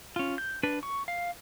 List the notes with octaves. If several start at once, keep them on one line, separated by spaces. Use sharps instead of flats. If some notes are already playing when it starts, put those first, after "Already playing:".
C#4 F4
G6
D4 B4
C#6
F5